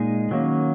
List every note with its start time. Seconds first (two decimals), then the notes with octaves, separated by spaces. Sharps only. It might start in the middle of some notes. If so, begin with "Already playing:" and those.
Already playing: A#2 G#3 D#4 G#4
0.31 D#3 F#3 A#3 C#4